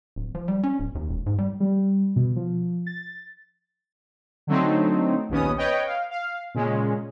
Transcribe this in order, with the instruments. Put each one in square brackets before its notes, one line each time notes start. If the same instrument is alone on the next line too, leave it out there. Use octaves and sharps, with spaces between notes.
[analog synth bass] D1
F3
G3
C#4
D1
D#2
E1
G#2
G3
[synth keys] G3
B2
F3
A6
[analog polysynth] D3 F#3 A3 C4 D#4
A#1 D#2 B3 C#4 D#6
B4 C#5 D#5 G5
F5
F5
A#2 C#3 G#3 C#4